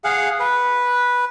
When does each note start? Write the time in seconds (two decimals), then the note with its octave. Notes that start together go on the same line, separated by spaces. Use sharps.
0.04 G#4 F5 F#5
0.40 B4